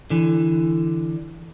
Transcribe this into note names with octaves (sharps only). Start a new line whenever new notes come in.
D3 E3